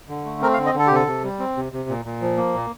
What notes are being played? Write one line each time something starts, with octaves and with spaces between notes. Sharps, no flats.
D3
A3
C4 A#4
F5
D3
D#5
D3
A4
G4
C3 A4
C3
G3
C4
C3
C3
A#2
A#2
F3
A#3
A#2